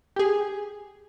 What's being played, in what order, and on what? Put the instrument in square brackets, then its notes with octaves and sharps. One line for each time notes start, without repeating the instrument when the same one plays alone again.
[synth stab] G4 G#4